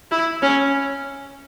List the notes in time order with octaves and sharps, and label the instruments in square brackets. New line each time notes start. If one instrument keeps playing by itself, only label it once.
[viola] E4
C#4